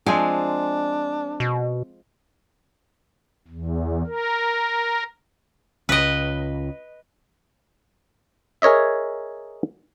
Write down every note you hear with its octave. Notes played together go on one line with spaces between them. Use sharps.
F3 G#3 C4 D4 G#5
B2
E2
A#4
C#2 B4 D#5
G#4 A#4 C#5 D#5 E5